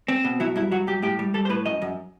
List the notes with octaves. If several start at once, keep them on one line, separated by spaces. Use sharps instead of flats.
C4
B2
F#3 E4
G2 E4
F#3 F#4
G2 G4
A2 G4
G3
G3 A4
C5
A2 B4
F#2 D#5
F#2